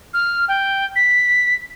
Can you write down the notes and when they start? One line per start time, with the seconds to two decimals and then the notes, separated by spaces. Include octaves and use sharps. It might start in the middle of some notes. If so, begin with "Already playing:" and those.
0.14 F6
0.48 G5
0.96 B6